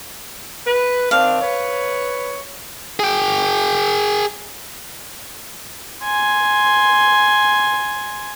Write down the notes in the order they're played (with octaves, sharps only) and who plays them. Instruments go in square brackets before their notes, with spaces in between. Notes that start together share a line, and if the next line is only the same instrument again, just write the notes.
[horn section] B4
[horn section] D#3 C4 D4 [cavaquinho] F5
[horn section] B4 C#5
[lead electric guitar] G#4 G5
[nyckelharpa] G#5 C6